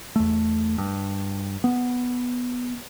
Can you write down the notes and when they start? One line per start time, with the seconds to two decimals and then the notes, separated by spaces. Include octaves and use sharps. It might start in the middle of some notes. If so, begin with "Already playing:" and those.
0.16 E2 A3
0.78 G2
1.64 B3